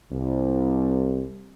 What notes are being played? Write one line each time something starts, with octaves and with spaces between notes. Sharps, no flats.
C2